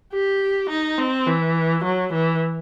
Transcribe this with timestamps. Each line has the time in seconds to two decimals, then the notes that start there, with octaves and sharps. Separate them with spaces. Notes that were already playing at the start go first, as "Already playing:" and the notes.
0.13 G4
0.71 D#4
0.99 C4
1.27 E3
1.85 F#3
2.14 E3